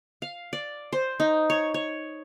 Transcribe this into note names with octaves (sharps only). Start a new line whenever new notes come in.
F5
D5
C5
D#4
C#5
C#5